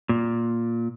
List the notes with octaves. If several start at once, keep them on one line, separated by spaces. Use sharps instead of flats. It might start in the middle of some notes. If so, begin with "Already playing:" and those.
A#2